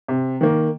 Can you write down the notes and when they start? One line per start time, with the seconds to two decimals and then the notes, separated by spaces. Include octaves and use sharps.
0.08 C3
0.41 D#3 A#3